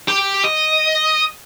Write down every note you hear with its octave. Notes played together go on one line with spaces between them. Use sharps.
G4
D#5